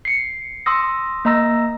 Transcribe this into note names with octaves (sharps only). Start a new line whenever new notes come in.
C7 C#7
C6 D#6 E6 A#6
A#3 D#5 A#5 E6 A#6